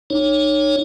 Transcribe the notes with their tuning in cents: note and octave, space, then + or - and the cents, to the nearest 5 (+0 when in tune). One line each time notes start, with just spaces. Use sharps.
D#4 -30 C#5 +0